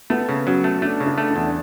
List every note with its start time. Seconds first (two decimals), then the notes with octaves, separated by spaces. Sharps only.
0.10 A3 B3
0.29 C#3
0.47 F#3 C#4
0.64 A3
0.82 A3 D4
1.00 C#3
1.06 D4
1.18 A3
1.30 D4
1.36 E2